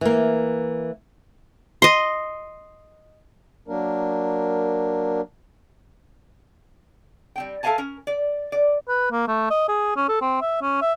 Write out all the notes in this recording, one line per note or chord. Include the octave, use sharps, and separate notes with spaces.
E3 A#3
D#5 C6
F#3 A#3 D4 A#4
G3 C4 G5
A4 A#4 E5 F5 G#5 A5
C#4 A#4
D5
D5
B4
A#3
A3
D#5
G#4
C#4
A4
C4
E5
C#4
E5